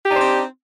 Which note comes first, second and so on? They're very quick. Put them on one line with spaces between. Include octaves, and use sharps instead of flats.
G4 D#4 D4 C5 C4